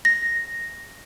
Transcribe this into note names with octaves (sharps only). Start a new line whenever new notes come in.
A#6